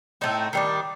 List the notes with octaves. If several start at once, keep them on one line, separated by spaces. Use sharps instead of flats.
A2 A3 C4 D#4
D#3 G3 D4